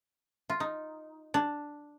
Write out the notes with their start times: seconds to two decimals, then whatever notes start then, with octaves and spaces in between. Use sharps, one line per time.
0.50 F4
0.60 D#4
1.34 D4